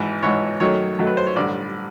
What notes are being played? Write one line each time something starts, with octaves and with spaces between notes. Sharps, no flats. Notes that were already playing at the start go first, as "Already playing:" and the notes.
Already playing: G#1 G#2 E3
G#1 G#2 E3 C#5
F#2 D#3 F#3 A3 C#5
F#2 D#3 F#3 A3
B4
C5
C#5
A1 G2 D3 D5